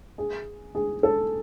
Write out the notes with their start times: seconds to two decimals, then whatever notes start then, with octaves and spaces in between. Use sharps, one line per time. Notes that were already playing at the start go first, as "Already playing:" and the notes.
0.18 G#4
0.75 G#4
1.03 A4